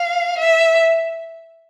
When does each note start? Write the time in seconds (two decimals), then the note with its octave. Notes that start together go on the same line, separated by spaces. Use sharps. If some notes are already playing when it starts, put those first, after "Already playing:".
Already playing: F5
0.38 E5